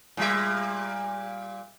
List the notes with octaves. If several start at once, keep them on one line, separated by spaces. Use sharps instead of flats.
A#2 G3 E5